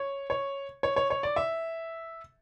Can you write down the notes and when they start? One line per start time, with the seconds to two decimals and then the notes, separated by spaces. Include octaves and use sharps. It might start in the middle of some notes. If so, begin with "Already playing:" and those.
Already playing: C#5
0.30 C#5
0.83 C#5
0.96 C#5
1.10 C#5
1.23 D5
1.36 E5